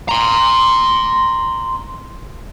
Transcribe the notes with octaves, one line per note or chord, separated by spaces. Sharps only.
A#5 C6